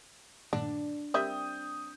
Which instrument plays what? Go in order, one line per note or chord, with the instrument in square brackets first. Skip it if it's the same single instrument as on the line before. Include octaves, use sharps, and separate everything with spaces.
[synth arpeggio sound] G2 A#2 D#3 [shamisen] D3 [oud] D4
[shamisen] G3 C4 E5 [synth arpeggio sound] A#4 [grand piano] D#6 G6